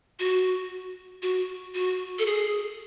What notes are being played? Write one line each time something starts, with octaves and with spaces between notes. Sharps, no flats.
F#4
F#4
F#4
A4
G#4